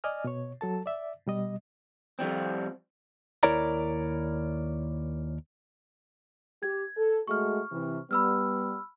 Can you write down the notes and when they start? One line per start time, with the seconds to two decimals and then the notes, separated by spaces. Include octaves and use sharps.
0.04 D5 D#5 G#5 F6
0.24 B2 C#5
0.61 F#3 A4 A5
0.86 D5 E5
1.26 B2 G3 D#5
2.19 F2 F3 G3 C4
3.43 D#2 E4 A#4 C#5 D5 A#5
6.63 G4 G#6
6.97 A4
7.27 G#3 A3 F#4 C#6 F6
7.71 C3 E3
8.11 G3 B3 B5 E6 F6